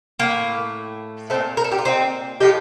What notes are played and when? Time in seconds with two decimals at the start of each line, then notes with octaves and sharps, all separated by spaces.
0.20 A2 A3 A#3
1.30 A#2 G3 A3 C4
1.57 A#4
1.64 A4
1.72 G4
1.79 F4
1.85 C4 D#4
2.40 A2 F3 A3 D#4 G4